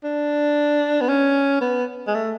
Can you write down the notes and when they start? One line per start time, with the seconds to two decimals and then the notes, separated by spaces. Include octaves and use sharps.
0.04 D4
1.01 B3
1.09 C#4
1.61 B3
2.07 G#3
2.15 A3